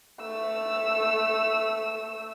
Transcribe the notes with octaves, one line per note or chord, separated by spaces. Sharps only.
A3 E6